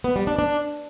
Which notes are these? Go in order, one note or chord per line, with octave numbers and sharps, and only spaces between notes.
B3
G3
D4
D4